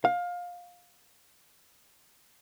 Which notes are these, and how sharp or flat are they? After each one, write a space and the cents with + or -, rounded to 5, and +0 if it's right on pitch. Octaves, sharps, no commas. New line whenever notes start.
F5 +20